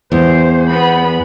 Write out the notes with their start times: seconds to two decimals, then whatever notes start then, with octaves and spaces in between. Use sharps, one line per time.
0.12 E2 C5
0.69 B3 B5